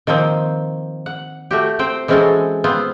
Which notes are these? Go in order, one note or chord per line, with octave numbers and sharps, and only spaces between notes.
D#3 F3 A#3 C4
F#5
A3 F#4 G4
C4 C5 G5
E3 G#3 C4 C#4 F#4 A4
B3 C4 F4